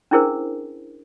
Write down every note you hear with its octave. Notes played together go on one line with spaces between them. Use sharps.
C#4 D4 E4 G#4 A#4 C5